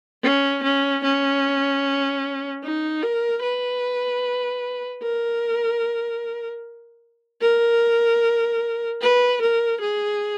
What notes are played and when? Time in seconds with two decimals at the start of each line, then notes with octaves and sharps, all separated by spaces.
0.23 C#4
0.63 C#4
1.04 C#4
2.63 D#4
3.02 A#4
3.42 B4
5.02 A#4
7.41 A#4
9.02 B4
9.42 A#4
9.81 G#4